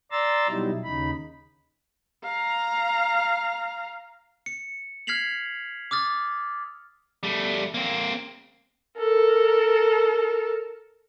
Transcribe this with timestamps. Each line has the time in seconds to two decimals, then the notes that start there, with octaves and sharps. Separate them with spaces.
0.11 D5 A#5 C6 E6 A6
0.48 B2 F#3 G3 D#4 E4
0.84 D#2 C#3 D#4 B5
2.24 F5 A#5
4.46 C#7
5.07 F6 G#6 B6 C7 F7 F#7
5.91 D6 D#6 F6 A6
7.23 G3 A3
7.74 A#3 C4
8.98 A4 A#4